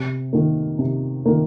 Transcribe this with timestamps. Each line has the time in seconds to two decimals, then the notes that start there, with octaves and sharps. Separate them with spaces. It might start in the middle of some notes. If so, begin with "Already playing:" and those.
Already playing: C3
0.33 D#3 A#3
0.79 C3
1.26 D#3 A#3